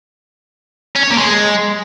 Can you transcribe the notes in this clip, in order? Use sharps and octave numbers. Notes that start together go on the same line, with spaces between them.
C#4
C#5
A#3
G#3